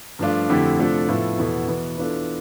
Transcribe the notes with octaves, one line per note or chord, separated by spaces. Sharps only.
G2 F3 A3 D4 F4
F2 D3 A3 E4 G4
C3 F3 A3 D4 A4
A2 F3 B3 F4 A4
E2 B2 B3 E4 A4
E2 B2 B3
E3 B3 D4 F4 A4